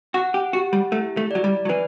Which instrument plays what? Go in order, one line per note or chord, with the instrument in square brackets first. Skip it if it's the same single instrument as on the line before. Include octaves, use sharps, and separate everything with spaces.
[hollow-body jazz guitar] F#4 [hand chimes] F#5
[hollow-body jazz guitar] G4
[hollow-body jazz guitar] F#4 [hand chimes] G4
[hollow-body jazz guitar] G3
[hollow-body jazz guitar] A3 [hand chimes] E4
[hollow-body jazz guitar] A3
[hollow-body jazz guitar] F#3 [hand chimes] D5
[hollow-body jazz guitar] G3
F#3
[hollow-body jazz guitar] E3 [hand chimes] B4